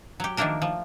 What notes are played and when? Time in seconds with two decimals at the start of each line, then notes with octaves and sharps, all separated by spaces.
0.20 F#3 G4
0.37 D#3 F3 A3 A#3 D4 A#4
0.62 F3